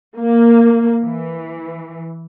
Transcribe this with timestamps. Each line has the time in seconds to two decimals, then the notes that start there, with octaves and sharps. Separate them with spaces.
0.19 A#3
1.03 E3